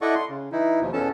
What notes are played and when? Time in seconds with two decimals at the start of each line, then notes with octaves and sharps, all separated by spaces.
0.02 E4 A4 D5 D#5 F#5 C#6
0.15 C6
0.29 C#3
0.52 E3 D#4 E4
0.81 D#2 B2 F3
0.93 E2 B2 B3 C#4 A4 A5